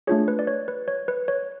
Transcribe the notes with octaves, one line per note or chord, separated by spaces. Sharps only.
A3 D4 F4 G#4 C#5
B4
D5
C#5
B4
C#5
B4
C#5